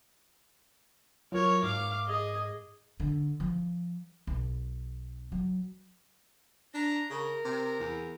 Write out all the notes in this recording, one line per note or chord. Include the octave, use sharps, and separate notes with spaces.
F#3 F4 A#4 C#5
G#2 F5 D6
G#4 D#5
D3
F3
B1
F#3
D4 A#5
C#3 A#4
C3
E2